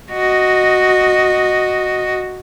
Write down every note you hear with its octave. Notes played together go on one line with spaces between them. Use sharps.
F#4 D#5